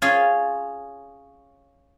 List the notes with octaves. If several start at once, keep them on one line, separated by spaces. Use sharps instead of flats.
C#4 F4 G#4